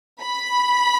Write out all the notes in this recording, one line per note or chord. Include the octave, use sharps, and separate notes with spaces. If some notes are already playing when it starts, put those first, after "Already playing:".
B5